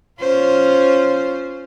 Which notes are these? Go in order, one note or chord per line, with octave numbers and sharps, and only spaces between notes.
C#4 F4 C5